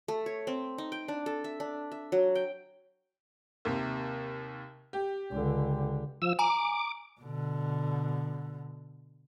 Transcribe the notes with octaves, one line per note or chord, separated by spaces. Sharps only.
A3
C#5
C4
D#4
G5
D4
A4
E5
D4
E5
F#3
G5
D#2 C3
G4
C#2 D3
F3 E6
G#5 A#5 D6
B2 D3